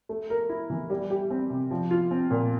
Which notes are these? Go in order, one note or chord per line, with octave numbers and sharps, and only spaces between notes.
A3
A#4
E4
E3
G3
G4
C4
C3
F3
F4
C4
A#2